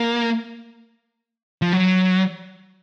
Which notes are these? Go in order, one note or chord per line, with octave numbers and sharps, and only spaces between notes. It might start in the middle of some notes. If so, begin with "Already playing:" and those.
Already playing: A#3
F3
F#3